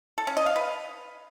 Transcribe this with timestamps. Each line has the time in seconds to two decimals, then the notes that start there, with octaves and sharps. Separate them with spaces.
0.18 A4
0.27 C#4
0.37 D#5
0.46 F5
0.56 B4